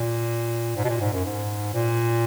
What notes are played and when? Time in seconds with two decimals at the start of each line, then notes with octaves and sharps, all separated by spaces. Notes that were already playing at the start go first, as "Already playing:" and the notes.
Already playing: A#2
0.77 G#2
0.84 B2
0.89 A#2
1.01 G#2
1.13 F#2
1.26 G#2
1.74 A#2